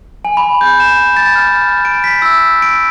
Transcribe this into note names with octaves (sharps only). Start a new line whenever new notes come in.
G#5
B5
G6
E7
A6
F6
D7
B6
E6
D7